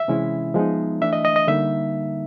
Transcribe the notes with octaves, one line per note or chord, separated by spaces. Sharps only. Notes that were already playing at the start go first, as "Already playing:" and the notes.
Already playing: E5
C3 E3 G#3 C#4 E4
F3 G#3 B3 D#4
E3 A3 D4 E5
D#5
D#5
D#5
D3 G3 A#3 D#4 E5